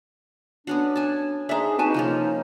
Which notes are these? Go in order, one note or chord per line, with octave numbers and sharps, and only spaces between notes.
B3 C#4 D4 F#4
G#5 A5
D4 D#4 G#4 C5 E5 G#5 A#5
C4 D#4 F#4 B4 G#5 A5
C3 F3 A#3 C#4